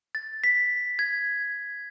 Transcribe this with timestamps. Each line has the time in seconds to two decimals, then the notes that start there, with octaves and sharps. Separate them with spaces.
0.15 A6
0.44 B6
0.99 G#6